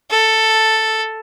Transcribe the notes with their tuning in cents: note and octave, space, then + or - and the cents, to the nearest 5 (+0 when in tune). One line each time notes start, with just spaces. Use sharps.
A4 +5